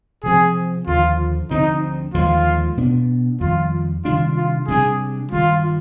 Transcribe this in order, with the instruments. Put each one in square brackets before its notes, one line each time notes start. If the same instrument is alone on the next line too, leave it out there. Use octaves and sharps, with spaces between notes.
[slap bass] C3 F3 C4 [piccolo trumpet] G#4
[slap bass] D#2 D3 F3 [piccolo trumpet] F4
[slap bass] D2 D3 F3 C4 [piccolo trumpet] D#4
[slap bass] D#2 D3 F3 G#3 [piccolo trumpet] F4
[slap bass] B2 B3 D4
[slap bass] F2 D#3 G3 [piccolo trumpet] F4
[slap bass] C3 D#3 G3 D4 [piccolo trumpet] F4
[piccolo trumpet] F4
[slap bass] C3 G3 D4 [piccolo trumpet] G#4
[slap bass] G2 D#3 G3 [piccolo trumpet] F4